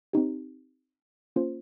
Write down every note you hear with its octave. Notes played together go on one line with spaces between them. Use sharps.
C4 D#4 G4
A#3 C#4 F4 C5